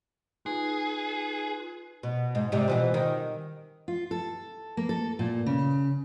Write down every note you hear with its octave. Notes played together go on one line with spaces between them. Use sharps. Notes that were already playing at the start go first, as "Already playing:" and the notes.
D#4 F4 G#4 B4
B2
G#2
G#2 C3 G3
B2 E3 F3
D#3
F4
A4
A#3
A4
A#2
C#3